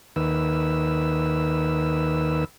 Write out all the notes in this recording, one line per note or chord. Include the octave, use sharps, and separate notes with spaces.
D#2 D#3 B4 E6